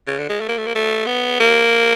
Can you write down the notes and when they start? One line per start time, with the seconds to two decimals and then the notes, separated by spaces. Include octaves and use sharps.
0.07 C#3
0.19 D3
0.29 G#3
0.40 A3
0.49 A#3
0.58 A3
0.66 A#3
0.75 A3
1.06 B3
1.40 A#3